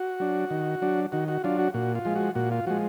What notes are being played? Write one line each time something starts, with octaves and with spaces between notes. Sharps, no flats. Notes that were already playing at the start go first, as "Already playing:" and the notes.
Already playing: F#4
F#3 D4
D#3
F#3 D4
D#3 F#4
F#4
F#3 D4 F4
F#4
A#2 F#4
F4
F3 G#3
F#4
A#2 F#4
F4
F3 G#3 F#4